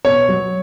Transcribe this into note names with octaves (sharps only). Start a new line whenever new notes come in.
B2 C#5
F#3